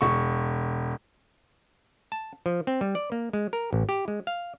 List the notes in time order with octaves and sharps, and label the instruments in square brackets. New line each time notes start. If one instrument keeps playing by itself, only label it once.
[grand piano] E1 C#6
[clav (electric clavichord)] A5
F3
C4
G3
D5
A#3
G#3
A#4
A1
G4
G#3
F5